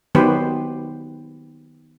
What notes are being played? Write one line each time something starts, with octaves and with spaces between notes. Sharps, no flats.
D#3 F#3 B3 G4 B4 C5